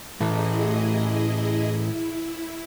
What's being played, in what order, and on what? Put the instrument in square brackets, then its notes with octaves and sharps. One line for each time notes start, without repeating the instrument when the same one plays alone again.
[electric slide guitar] A2 E3 A4 [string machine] E4 G#4 D#5
[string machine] E4